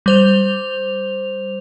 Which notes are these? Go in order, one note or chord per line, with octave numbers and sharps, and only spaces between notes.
G3 C5 F7